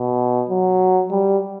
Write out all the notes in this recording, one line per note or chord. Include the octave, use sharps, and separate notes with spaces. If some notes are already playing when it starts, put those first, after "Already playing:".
Already playing: B2
F#3
G3